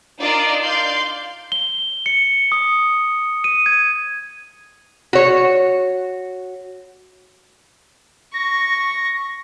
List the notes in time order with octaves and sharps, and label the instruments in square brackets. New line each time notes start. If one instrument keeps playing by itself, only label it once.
[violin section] D4 D#4 F4 A#4 D5 D#5
D5 F5 C6 G6
[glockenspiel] G7
C#7
D#6
D#7
G#6
[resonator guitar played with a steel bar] F#4 C#5
[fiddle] C#6 [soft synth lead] A#6